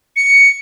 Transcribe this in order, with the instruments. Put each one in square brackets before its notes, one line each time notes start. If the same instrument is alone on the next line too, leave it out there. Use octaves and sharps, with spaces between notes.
[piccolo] C#7